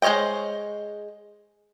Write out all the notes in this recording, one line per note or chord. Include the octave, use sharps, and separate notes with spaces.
G#3 C5 C#5 D#5 G5